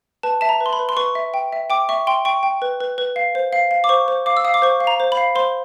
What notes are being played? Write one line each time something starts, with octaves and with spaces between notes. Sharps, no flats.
B4 A5
E5 A5
A#5
B4
C6
B5
B4
C6
B4 C#6
E5
G5
E5
G5 D6
E5 C#6
G5 C6
G5 C#6
G5
B4
B4
B4
F5
C5
F5
F5
D6
C5 C#6
C5
F5 D6
E6
F5 D#6
D6
C5 C#6
F5
A#5
C5
B5
F5
C5 C6